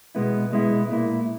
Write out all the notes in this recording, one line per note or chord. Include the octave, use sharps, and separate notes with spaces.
B2 G#3 B3 E4
B2 G#3 B3 E4
A#2 A#3 E4